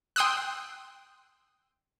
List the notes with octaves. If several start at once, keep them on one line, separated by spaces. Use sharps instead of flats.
G5 C6 D#6 E6 F#6